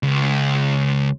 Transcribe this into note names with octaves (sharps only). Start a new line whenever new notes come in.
C#2